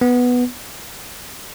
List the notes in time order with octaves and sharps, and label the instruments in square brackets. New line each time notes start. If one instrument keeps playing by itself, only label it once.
[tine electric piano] B3